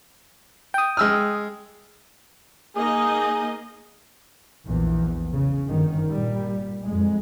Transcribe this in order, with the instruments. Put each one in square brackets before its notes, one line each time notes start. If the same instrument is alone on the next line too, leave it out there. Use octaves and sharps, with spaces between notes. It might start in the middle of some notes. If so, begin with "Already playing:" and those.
[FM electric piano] G5 D#6
[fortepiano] G#3 E6 F6
[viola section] A#3 D#4 D#5 [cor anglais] G#4
[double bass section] A#1 E2
C#3
G1 D#3
A#2 G3
F2 G#3